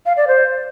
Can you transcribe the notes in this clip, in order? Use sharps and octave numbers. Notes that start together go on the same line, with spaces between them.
F5
D5
C5